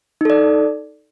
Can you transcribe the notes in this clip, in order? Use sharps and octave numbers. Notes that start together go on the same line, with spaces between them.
D#4 A4 D5